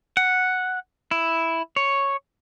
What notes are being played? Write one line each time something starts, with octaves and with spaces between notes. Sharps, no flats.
F#5
E4
C#5